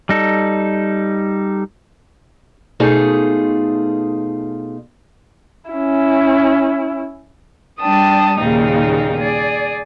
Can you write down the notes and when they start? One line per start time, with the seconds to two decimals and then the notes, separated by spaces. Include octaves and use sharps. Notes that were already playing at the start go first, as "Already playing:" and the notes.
0.09 G3 D#4 A4
2.80 B2 A3 D#4 F4 G#4
5.71 C#4 E4
7.80 G3 D4 G5 A5 D#6
8.39 D#2 A#2 C#3 G3 A#3 D#4
9.20 G#4 D5